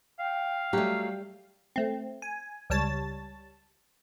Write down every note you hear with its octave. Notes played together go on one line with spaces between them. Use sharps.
F5 G5
F#3 G3 A3 G4
A3 C4
G#5
C#2 G3 C#5 A5 A6